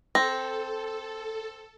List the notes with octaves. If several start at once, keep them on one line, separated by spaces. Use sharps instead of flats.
C4 A4 A#6